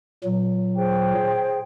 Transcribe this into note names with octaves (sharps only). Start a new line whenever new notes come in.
A#2 F#3
G#4 C5 G5